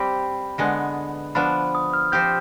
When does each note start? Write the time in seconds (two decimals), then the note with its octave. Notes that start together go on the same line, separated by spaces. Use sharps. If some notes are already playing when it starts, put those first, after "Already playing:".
Already playing: G3 C4 G4 B5
0.58 D3 G#3 B3
1.35 F3 B3 D4 B5
1.75 D#6
1.94 F6
2.12 F3 C4 G4 G6